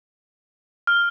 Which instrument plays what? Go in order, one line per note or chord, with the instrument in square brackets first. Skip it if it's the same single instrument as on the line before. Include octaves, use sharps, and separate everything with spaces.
[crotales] F6